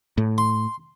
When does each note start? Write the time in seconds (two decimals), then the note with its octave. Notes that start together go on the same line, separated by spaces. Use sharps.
0.18 A2
0.38 C6